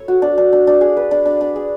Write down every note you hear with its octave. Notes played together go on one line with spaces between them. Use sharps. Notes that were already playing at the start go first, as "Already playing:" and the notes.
Already playing: A4 C#5
F#4
D4
D4
D4
D4
G#4
B4
D4
D4
D4
G#4